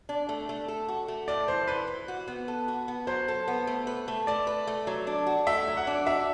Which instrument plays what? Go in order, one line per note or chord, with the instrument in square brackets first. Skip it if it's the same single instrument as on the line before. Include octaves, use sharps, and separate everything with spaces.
[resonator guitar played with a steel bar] D4
A3
A3
A4
F#4
A3
[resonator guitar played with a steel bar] A2 [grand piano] D5
[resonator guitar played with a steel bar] E3 [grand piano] C5
[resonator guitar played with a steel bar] E3 [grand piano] B4
[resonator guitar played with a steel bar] E3
F#4
B3
A4
F#4
B3
[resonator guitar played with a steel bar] F#3 [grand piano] C5
[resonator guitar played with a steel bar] A4
B3
A3
B4
A3
[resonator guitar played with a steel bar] A3 [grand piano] D5
[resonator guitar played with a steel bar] B4
A3
F#3
D4
F#4
[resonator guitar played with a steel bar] A3 [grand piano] E5
[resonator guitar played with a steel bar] F#3
[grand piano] F#5
[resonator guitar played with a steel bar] D4
[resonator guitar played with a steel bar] F#4 [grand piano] E5